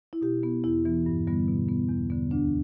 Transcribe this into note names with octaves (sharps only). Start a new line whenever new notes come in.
E4
B2 G4
B3
E2 E4
E3 B3
G2
D3 G3 B3
B2
B3
E2
D3 B3
D2 D4